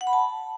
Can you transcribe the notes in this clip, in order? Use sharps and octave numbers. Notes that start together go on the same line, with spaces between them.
F#5
B5
A5